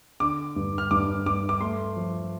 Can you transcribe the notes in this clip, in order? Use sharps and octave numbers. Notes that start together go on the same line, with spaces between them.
D3 D6
G2
F6
G2 D6
G2 D6
D6
A3 C6
F3